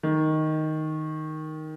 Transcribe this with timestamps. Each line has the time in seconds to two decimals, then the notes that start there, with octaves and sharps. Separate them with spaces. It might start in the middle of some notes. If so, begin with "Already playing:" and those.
0.03 D#3